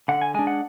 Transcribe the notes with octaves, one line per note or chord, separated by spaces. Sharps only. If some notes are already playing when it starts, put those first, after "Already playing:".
D3 F#5
G#5
G#3 D4 G#5
F#5